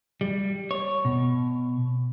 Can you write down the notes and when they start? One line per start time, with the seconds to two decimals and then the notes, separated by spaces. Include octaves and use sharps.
0.21 G3
0.71 C#5
1.05 B2